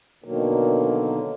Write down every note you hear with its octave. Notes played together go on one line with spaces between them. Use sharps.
B2 D3 D#3 F#3 A#3